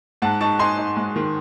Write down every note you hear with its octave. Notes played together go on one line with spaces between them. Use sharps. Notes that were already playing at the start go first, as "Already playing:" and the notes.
G#2 F#5 A5
D#4 A5 C#6
D#4 G#5 C6
D#4
G#3
D#3